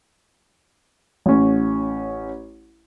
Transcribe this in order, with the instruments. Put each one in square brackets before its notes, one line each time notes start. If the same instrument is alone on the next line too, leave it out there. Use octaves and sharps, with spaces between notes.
[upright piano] A1 C#4